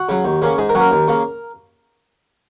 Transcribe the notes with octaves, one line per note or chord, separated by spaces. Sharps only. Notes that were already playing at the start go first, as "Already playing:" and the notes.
Already playing: F#4
C#3 F#3
D#2
C#3 A#3 C#4
G#2 G#4
A#4
F#3 A#3 C#4
A#4
D#2
C#3 A#3